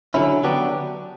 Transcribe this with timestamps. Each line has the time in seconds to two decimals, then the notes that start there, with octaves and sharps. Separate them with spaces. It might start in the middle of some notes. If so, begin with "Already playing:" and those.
0.14 D3 F#3 C#4 E4
0.44 D3 F#3 B3 D4 G4